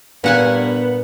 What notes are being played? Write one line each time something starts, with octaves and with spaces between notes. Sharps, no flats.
G2 A#2 B3 F#5 G#5